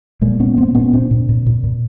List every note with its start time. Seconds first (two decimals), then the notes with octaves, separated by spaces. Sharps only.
0.21 A#2 G#3 A#3
0.40 A#2 B3 C#4
0.57 A#2 A#3 C4
0.75 A#2 B3 C#4
0.93 A#2 C4 D4
1.11 A#2
1.29 A#2
1.46 A#2
1.64 A#2